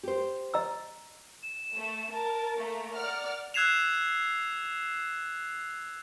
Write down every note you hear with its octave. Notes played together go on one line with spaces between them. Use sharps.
G4 C5
D#5 A#5 E6
E7
A3
A#4 A5
A3 A#3 A#5
D5 F#5 F6
E6 F#6 G#6 C7 E7 F7